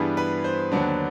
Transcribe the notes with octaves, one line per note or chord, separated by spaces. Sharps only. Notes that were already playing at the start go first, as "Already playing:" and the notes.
Already playing: G2 E3 G3 B3 D4 G#4
B4
C5
D#2 D3 F#3 B3 D4